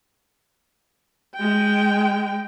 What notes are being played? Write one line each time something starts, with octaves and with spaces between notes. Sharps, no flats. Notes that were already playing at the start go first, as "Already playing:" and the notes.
G#3 G5